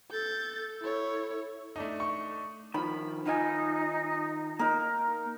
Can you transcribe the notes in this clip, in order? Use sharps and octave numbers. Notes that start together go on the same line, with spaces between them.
A4 G6 A6
E4 C#5
A3 D4 D#4
C#6
D#3 F3 B5
D#3 D#4 F4 G#5
A#3 D#4 A#4